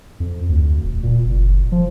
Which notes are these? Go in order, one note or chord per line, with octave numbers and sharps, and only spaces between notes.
F2
D2
D#1
A#2
F#1
F3